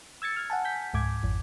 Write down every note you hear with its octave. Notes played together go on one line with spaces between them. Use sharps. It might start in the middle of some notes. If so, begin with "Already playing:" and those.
E6 G#6 A6 C#7
F6 G#6
F#5 G#5 A5
G6 B6
C#2 G#2 D6 G#6
G#1 F2